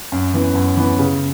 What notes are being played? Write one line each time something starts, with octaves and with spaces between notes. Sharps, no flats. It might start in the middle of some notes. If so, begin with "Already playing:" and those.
F#2
E3 B3
F#2
E3 B3
C#3